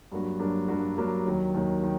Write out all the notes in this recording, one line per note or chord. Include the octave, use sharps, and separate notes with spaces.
G2 F#3 A#3 D4 F#4
G2 F#3 A#3 D4 F#4
G2 F#3 A#3 D4 F#4
G2 F#3 A#3 D4 F#4
D#2 D#3 F#3
D#2 D#3 F#3
D#3